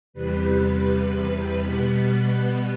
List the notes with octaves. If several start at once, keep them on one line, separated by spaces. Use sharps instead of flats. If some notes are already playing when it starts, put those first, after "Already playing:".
E2 C3 G3 B4
B2 G3 B3